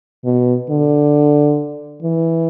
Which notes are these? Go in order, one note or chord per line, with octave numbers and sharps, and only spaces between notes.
B2
D3
E3